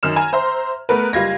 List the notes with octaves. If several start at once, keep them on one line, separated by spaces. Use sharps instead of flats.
F#2 D#3 F6 E7
G#5 A#5
C5 E5 A#5 C6
A3 B3 A#4 B4
F#1 G3 F4 G#6 A#6